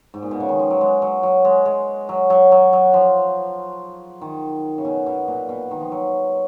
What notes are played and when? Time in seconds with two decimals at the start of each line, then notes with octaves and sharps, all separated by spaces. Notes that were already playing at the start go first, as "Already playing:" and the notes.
0.14 G#2
0.23 A#2
0.31 B2
0.40 C#3
0.49 D#3
0.59 F3
0.70 F#3
0.81 G#3
1.02 F#3
1.23 F#3
1.45 G#3
1.66 G#3
2.09 F#3
2.30 F#3
2.52 F#3
2.73 F#3
2.94 F3
4.21 D#3
4.78 C#3
4.85 B2
5.06 B2
5.28 A#2
5.49 B2
5.71 D#3
5.81 F3
5.92 F#3